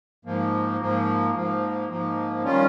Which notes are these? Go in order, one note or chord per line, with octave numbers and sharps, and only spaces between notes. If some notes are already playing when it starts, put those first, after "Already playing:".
G#2 F3 A#3
G#2 F3 A#3
G#2 F3 A#3
G#2 F3 A#3
D#3 G3 C#4 F4